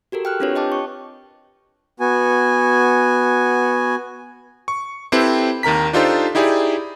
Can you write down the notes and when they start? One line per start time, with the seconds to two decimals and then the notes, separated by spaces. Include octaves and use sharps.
0.12 F#4 G4 A4 A#4
0.25 G5 F6 F#6
0.40 C4 D4 F4 G4 B4 C#5
0.56 D#5 G5 A5 D6
0.72 C#6
2.00 B3 F#4 G#5
4.68 C#6
5.12 C4 E4 G4 A4 B4 C5
5.63 D#2 D#3 A#4 A#5 B6
5.93 D4 D#4 F4 G4 A4 C5
6.35 D#4 E4 G4 G#4 D5